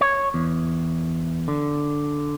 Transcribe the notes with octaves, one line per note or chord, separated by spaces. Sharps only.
C#5
E2
D3